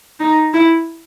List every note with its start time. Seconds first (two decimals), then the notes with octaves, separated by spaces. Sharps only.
0.19 D#4
0.53 E4